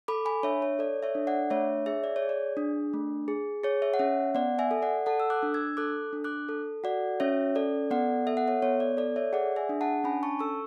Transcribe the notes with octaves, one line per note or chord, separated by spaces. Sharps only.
A4 B5 D6
G#5 B5
D4 C#5 E5
C#5
A4 D5
C#5 E5
D4
D5 F#5
A3 C#5 E5
G#4 C#5 E5
D5
C#5
G#4
D5
D4
A3
G#4
G#4 C#5
C#5 E5
F#5
C#4 C#5 E5
B3 D5 F#5
E5 G#5
A4
D5 F#5
A4 F#5 A5
E6
D6 F#6
D4
E6 G#6
A4 D6 F#6
D4
D6 F#6
A4
F#4 D5 F#5
C#4 C#5 E5
A4 D5
B3 D5 F#5
A4 E5
F#5
C#5 E5
B3 C#5
D5
A4 D5
C#5 E5
G#4 D5 F#5
E5 G#5
D4
F#5 A5
C#4 G#5 B5
A5 C#6
A4 C#6 E6